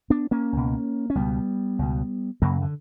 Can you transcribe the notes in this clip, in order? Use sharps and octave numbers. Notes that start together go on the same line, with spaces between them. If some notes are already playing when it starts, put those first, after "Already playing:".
B3 D4
A#3 C#4
C#2 B2
C#4
C#2 B2 G3 B3
C#2 B2
F#2 C#3 F#3 A#3
D3